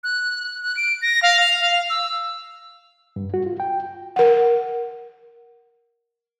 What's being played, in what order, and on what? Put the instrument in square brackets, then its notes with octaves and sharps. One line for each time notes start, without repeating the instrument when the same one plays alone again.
[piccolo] F#6
F#6
D7
A#6
F5
F7
F5
E6
[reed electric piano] G2
F#4
F4
G5
[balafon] A#4 F#5